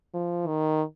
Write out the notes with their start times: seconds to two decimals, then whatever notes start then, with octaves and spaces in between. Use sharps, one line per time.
0.14 F3
0.47 D#3